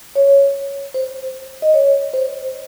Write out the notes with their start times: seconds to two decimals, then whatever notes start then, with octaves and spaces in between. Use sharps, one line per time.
0.15 C#5
0.94 C5
1.62 D#5
1.74 C#5
2.14 C5